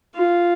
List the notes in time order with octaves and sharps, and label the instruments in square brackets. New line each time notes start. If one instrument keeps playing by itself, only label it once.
[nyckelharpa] F4